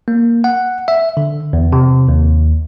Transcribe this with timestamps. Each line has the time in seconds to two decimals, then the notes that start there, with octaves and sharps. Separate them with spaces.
0.08 A#3
0.44 F#5
0.88 E5
1.17 D3
1.53 E2
1.73 C3
2.09 D#2